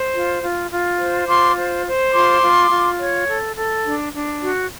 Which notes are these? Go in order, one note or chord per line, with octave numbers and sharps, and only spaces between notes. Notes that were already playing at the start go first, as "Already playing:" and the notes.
Already playing: C5
F4
F4
F4
C5
F4 C6 D6
C5
C5
F4 C6 D6
F4
F4
C#5
A4
A4
D4
D4
F#4